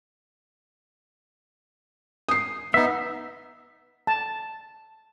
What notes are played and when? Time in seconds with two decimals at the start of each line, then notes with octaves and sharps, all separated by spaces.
2.29 D#6 C7
2.74 B3 D#4 E5
4.07 A5